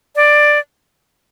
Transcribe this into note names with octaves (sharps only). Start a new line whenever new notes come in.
D5